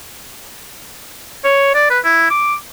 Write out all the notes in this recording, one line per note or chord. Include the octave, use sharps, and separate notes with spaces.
C#5
D5
B4
E4
D6